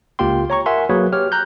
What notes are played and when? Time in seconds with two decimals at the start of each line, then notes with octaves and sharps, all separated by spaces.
0.19 C#2 A#3 F4 G4 G5 C6
0.50 C#5 A#5 C#6
0.66 A#4 E5 F#5 G#5 C6
0.90 F#3 A#3 F#4 G#4 B4 C#5
1.13 G4 C#5 F6
1.32 A#5 F#6 G6